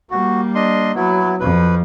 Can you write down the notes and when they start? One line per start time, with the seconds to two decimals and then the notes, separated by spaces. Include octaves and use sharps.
0.11 G3 A#3 F#4
0.55 D4 D#5 C6
0.95 F#3 B3 E4
1.40 F2 F3 B4